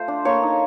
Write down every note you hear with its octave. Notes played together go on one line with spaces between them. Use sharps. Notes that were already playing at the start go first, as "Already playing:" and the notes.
Already playing: A3 F4 C5
D4
A#3 C#5
D#4